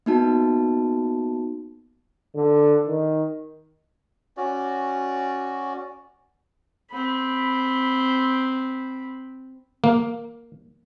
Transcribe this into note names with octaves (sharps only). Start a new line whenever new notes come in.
A#3 B3 D#4 F#4 A5
D3
D#3
C#4 F#4 D5
C4 B5
A#3